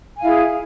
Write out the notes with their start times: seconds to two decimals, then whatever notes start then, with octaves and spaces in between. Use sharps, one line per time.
0.18 G#5
0.20 F5
0.23 E4
0.26 G#4